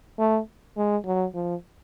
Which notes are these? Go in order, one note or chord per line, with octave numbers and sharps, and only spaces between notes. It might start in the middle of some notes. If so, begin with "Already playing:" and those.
A3
G#3
F#3
F3